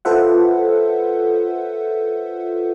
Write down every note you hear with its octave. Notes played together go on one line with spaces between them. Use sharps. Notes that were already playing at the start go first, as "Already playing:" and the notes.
F4 A4 B4 C5 E5 F#5